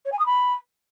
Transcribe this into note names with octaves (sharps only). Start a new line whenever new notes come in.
C#5
G#5
D#6
B5